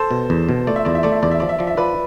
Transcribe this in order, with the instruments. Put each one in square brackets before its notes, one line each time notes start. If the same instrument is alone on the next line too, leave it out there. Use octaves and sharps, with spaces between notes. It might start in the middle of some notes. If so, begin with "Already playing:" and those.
Already playing: [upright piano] A4 C5
[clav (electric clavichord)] B2
E2
B2
[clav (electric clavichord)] A3 [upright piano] D5
[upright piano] E5
[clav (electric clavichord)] E2 [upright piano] D5
[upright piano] E5
[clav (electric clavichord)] A3 [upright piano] D5
[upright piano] E5
[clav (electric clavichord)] E2 [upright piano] D5
[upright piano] E5
[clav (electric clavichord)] F3 [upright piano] D5
[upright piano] E5
[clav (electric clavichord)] F3 [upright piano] D5
[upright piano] E5
[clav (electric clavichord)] F3 [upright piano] B4 D5